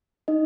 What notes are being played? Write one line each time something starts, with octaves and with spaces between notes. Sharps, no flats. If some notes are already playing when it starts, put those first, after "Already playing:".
D#4 D#5